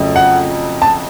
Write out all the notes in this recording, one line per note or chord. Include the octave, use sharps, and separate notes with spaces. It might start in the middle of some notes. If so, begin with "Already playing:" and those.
Already playing: F2 C#3 F#3 A3
F#5
A5